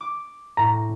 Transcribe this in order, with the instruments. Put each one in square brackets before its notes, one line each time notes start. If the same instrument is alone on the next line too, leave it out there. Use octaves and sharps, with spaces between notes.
[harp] D6
[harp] A2 [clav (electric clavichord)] A#5